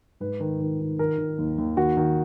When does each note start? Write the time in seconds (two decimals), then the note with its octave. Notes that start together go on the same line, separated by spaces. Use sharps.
0.20 G#2 B4
0.40 D#3
0.60 D#3
0.80 D#3
0.99 D#3 A#4
1.18 D#3
1.38 D#2
1.58 D#2
1.77 D#3 F#4
1.97 D#3